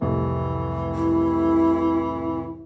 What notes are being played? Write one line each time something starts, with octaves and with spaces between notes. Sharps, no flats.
C2 F2 A2 E3
E4